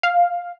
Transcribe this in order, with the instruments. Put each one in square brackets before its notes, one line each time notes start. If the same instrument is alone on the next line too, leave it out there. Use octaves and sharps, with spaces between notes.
[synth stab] F5